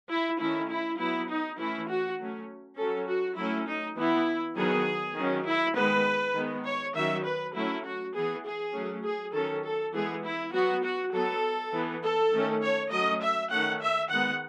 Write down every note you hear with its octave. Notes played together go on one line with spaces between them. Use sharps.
E4
D#3 A3 C#4 E4
E4
F#3 B3 E4
D#4
E3 A3 C#4 E4
F#4
F#3 A3 C#4
F#3 C#4 A4
F#4
F#3 A3 C#4 E4
D#4
E3 B3 E4
D#3 F#3 B3 G#4
D#3 F#3 C#4
E4
D#3 G#3 B3 B4
D#3 G#3 B3
C#5
D#3 F#3 C#4 E5
B4
F#3 A3 C#4 E4
F#4
E3 B3 G#4
G#4
F#3 A3 C#4
G#4
D#3 F#3 C#4 A4
A4
E3 G#3 B3 G#4
E4
F#3 B3 F#4
F#4
F#3 B3 A4
E3 B3
A4
D#3 A3 C#4
C#5
F#3 A3 C#4 D#5
E5
D#3 A3 C#4 F#5
E5
D#3 G#3 B3 F#5